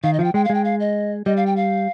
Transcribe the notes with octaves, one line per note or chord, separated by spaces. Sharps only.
D#3 F5
D#5
F3 F5
G5
G#3 G5
F5
G#3 G5
F5
D#5
G3 D#5
F5
G5
F5